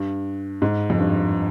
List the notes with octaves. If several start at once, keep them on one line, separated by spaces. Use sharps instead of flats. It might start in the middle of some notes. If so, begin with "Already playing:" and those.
Already playing: G2
G#2
F2
G2